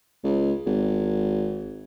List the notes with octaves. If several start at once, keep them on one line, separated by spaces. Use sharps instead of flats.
C#2
G#1